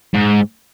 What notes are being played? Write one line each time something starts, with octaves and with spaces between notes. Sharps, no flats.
G#2